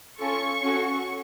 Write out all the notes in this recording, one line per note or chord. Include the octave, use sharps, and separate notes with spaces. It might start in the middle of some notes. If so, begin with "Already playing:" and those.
C#4 F4 A4 C#6
C#4 F#4 A4